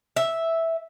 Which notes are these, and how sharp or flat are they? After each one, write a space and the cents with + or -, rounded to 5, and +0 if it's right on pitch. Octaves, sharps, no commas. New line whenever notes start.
E5 -5